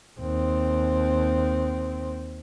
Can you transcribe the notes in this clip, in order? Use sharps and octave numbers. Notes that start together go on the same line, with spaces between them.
D#2 C4